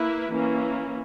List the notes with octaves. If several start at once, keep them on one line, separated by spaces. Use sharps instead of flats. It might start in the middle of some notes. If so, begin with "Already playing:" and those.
Already playing: A#3 E4 B4
E3 A#3 C#4